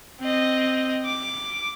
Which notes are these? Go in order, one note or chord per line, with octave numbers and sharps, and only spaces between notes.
C4 D#5
D6